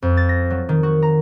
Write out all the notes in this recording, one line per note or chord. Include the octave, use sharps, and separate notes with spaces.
F2
A6
A#6
F#3
D#3
F#4
A#5